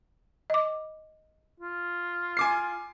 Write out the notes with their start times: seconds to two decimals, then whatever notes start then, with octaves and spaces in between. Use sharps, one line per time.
0.50 D#5 D6
1.60 F4
2.37 G#5 D6 C7